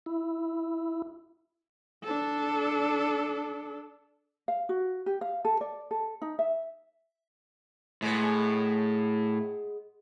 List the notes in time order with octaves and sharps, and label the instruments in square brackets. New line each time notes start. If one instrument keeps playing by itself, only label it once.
[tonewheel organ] E4
[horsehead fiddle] D4 A4
[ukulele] F5
F#4
G4
F5
A4
D5
A4
D#4
E5
[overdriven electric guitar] A2 [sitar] G#3 B3